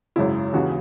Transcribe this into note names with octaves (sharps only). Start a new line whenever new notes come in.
G#1 F#2 C#3 E4
D#2 C#3 E3 F#4